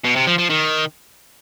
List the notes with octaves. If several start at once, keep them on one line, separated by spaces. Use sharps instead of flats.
B2
C3
F3
F3
D#3